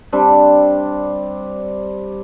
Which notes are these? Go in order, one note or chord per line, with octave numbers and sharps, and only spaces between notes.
G3 C4 D4